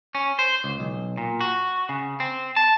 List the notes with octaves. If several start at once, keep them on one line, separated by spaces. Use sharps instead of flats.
C#4
C5
C#2
B1
A#2
F#4
C#3
C4
A5